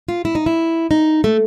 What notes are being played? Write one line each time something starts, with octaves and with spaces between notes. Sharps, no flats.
F4
E4
D#4
E4
D#4
A3